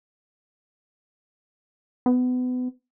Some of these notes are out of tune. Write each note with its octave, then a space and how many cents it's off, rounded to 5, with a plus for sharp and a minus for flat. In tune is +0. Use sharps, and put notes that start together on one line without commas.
B3 +30